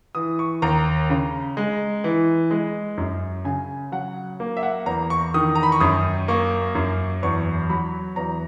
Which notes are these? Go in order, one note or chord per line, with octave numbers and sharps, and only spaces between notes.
E3 D#6
C#6
D#2 A#5
C#3
G#3
E3
G#3
F#2
C#3 G#5
F#3 F#5
A#3
E5
F#5
E2 A#5
C#6
D#3 D#6
A#5
B5
C#6
F#2 D#6
A#3 C#6
F#2
E2 C#6
F#3 B5
E2 A#5